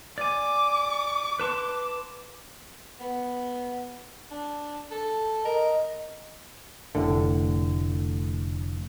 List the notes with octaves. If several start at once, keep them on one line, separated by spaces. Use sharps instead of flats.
D5 G#5 D6
B4 A5 C6
B3
D4
A4
A#4 D#5
F1 A2 D3